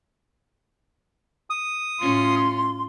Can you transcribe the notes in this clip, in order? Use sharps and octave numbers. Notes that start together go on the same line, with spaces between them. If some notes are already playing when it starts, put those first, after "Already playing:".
D#6
A2 C#4 F4 C6